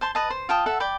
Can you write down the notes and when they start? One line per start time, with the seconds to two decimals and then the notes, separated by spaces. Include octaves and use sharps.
0.01 C5 A5 C6
0.15 B4 D#5 A5
0.30 C5
0.49 F4 G5 A5 D#6
0.66 A4 E5 F#5
0.80 D5 G5 B5